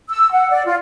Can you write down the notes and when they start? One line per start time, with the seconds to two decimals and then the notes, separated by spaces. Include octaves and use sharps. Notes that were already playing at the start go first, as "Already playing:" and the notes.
0.09 E6
0.32 F#5
0.50 D5
0.66 F4